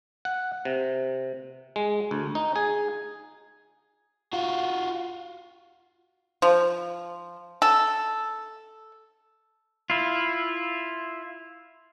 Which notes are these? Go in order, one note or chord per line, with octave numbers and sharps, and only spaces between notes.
F#5
C3
G#3
D2
D#4
G#4
F4 F#4
F3
A4
E4 F4